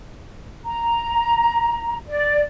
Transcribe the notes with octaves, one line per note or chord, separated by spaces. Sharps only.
A#5
D5